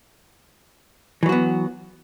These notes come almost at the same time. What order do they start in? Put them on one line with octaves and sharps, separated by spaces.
E3 F#3 F#4 B3